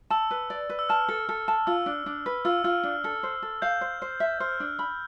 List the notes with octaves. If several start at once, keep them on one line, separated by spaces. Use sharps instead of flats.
A5 E6
B4
D5
B4
E6
A5 F6
A4
A4
A5
F4 E6
D4
D4
B4
F4 E6
F4 F6
D4
A4
C5
A4
F5 G6
C5
C5
E5
C5 F6
D4
B5